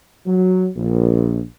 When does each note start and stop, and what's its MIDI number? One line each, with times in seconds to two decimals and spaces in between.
0.26 0.68 54
0.76 1.40 34